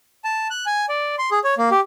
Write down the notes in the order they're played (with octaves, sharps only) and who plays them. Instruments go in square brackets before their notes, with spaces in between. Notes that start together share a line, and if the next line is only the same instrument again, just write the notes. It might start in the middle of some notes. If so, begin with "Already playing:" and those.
[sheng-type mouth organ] A5
F#6
G#5
D5
C6
G#4
C#5
A#3
G4